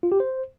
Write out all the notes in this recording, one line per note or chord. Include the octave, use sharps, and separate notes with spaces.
F4
G4
C5